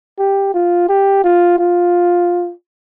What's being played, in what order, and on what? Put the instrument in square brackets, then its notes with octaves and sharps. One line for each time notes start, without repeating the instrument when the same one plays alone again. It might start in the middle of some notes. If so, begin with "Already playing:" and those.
[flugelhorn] G4
F4
G4
F4
F4